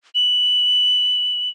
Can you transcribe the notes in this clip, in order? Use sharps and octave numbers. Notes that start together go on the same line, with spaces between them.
F#7